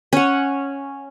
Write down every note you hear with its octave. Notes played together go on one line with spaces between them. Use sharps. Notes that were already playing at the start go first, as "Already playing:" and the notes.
C#4 F#5